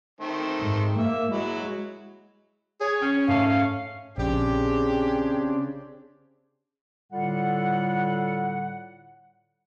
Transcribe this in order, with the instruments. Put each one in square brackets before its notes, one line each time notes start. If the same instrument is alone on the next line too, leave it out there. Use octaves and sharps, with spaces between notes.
[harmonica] D#3 A3 C4
[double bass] G#2
[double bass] A#3 [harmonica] E5
[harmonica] F#3 E4 [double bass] G#3
[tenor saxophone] G#4 [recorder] C#5
[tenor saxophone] C#4 [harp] G5 G#6 C7
[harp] G#2 A3 [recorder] F5
[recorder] F5
[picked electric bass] A#1 [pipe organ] C#3 C4 D4 [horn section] G4 [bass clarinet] G#4
[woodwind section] A2 D3 G3 F4 A4 F#5